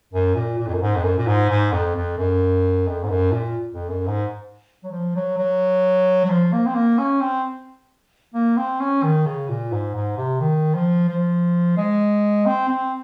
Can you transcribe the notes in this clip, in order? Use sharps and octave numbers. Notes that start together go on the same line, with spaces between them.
F#2
A#2
A#2
F2
F#2
G#2
F2
F#2
A#2
G#2
G#2
F2
F2
F#2
F2
G#2
F#2
A#2
F2
F#2
G#2
F#3
F3
F#3
F#3
F#3
F3
A#3
C4
A#3
C#4
C4
A#3
C4
C#4
D#3
C#3
A#2
G#2
G#2
C3
D#3
F3
F3
G#3
C4
C4